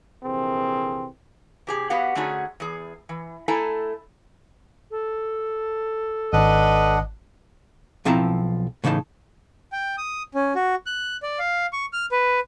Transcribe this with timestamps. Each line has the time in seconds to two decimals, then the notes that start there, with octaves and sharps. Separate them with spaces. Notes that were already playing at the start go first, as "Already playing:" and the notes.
0.23 A#1 C3 E3 C4 G#4 A#4
1.67 C3 G4 G#4
1.90 B3 F#4 G4 F5 F#5
2.15 D3 A3 C#4 D#4 F#4 G#4
2.60 E2 G#4
3.09 E3
3.48 A3 E4 A4 G#5 A#5
4.91 A4
6.33 G#1 D4 B4 D#5 F#5
8.05 B1 F3 C4 E4 A5 A#5
8.84 A2 C#3 E3 D#4 A5
9.72 G5
9.98 D#6
10.34 C#4
10.55 F#4
10.86 F#6
11.23 D5
11.39 F5
11.73 C#6
11.93 F6
12.12 B4